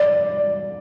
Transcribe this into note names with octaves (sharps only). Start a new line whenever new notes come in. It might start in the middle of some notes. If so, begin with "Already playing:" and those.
Already playing: D5